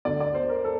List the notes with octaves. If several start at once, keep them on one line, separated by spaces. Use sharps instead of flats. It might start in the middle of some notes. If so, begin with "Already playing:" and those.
D2 D3 D5
D5
C5
A#4
A4